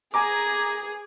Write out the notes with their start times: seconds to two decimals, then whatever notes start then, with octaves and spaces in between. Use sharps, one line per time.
0.14 G#4 G#5 A#5 D6